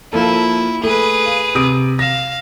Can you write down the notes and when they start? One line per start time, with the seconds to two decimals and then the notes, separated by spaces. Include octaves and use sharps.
0.13 F3 A#3 E4 A4
0.83 A3 G#4 B4
1.26 F5
1.55 C3 D#6 D7
1.99 F5 A#6 E7